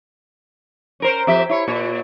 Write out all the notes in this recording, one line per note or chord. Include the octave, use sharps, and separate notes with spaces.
C#4 A#4 C5
F2 G4 E5
E4 C#5
A#2 C#5